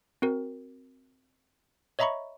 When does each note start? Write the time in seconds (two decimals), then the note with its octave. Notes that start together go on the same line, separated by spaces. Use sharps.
0.22 C4 F#4 A#4
1.99 C#5 D#5 E5 A#5 B5 C#6